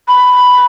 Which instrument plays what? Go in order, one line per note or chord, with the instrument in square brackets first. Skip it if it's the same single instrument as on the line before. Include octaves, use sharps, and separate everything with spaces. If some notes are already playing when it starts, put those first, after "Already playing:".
[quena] B5